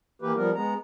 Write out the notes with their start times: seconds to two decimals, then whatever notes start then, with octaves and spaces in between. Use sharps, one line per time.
0.22 E3 A#3 G4 B4
0.36 F3 G3 B3 A#4
0.54 G#3 B3 A#5